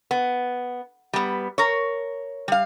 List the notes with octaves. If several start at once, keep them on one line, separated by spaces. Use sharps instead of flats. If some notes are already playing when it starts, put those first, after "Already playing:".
B3
G3 B3
A#4 C#5
G3 F5